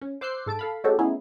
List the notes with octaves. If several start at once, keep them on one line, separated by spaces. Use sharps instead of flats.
C#4
C5 D6 E6 F#6 G6 C7
G#2 A4 A5 D7
A4 F5 B5
G#3 A3 C#4 F#4 G4 A4
A3 B3 C#4 D#4 E4 G#4